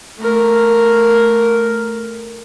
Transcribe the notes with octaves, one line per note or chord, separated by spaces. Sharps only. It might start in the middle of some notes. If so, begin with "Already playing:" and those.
A3 A#4